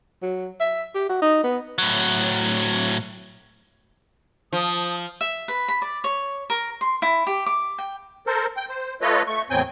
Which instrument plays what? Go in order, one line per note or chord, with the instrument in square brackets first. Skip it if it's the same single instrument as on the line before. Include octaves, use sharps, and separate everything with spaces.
[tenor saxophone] F#3
E5
G4
F#4
D#4
B3
[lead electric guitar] A2 F#3
[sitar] F3 [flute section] A5 D#6
[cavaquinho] E5
B4
B5
D5
C#5
A#4
C6
E4
G4
D6
G5
[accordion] A4 A#4 C5
G5
C5
A3 F4 A4 B4 C#5 D#5
A3 C#6
E2 A2 F#3 C4 G5 G#5